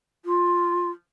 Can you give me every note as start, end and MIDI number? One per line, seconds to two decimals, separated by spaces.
0.25 0.90 65